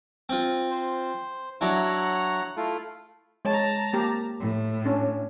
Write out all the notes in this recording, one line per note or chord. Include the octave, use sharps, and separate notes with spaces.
C4 F4
C5
F#3 D4 E4 C#5 F#5 A#5
A3 E4 F4
G#3 C#5 A5 A#5
A#3 G4
A2
C#4 D4